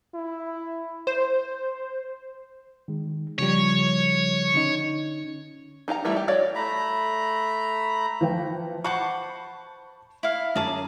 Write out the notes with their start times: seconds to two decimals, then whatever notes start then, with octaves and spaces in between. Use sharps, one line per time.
0.14 E4
1.07 C5
2.88 D#3 G#3
3.38 C#3 F3 G3 C#5
4.54 D3 C#4 D#4
5.88 D#4 G4 F5 A#5
6.05 E3 G3 A3 E4
6.16 G4
6.28 F#4 C#5 D5 F5
6.55 A3 A#5 B5
8.21 E3 F3 G5
8.84 C5 F#5 A5 B5 C#6 D6
10.23 E4 F5
10.55 F#2 G#4 A5 D6